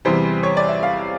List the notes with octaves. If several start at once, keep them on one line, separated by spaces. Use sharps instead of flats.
E2 C3 E3 G3 C5
C#5
D5
E5
F5